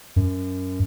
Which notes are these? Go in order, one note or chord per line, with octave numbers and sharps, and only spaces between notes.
F#2